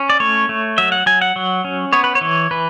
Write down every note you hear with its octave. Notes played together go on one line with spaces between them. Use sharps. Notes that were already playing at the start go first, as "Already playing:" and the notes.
Already playing: C#4
D5
A3 C#5
A3
F#3 E5
F#5
F#3 G#5
F#5
F#3
C#4
B3 C#5
B4
C#5
E3
E3 B4